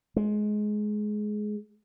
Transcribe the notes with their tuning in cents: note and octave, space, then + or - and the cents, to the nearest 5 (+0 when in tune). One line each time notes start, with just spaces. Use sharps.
G#3 +20